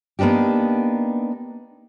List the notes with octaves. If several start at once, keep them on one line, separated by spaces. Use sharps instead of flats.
A#3 B3 D4 D#4 G4